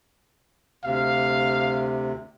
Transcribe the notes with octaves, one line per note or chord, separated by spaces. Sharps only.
D2 C3 F5